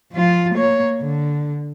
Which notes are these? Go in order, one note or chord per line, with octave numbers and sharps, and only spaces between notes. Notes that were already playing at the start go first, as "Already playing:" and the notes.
F3 F4
A#3 C#5
D3